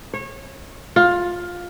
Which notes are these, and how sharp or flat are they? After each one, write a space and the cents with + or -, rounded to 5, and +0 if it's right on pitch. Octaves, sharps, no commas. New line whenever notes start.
C#5 -25
F4 +15